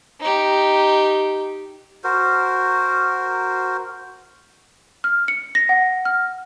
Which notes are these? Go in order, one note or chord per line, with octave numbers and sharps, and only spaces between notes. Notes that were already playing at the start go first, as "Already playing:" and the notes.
D#4 G4
F#4 A#4 C5
F6
C#7
A#6
F#5
F6